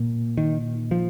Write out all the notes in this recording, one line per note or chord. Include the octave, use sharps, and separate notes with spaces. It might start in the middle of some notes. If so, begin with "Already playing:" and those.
Already playing: A#2
D#3
F3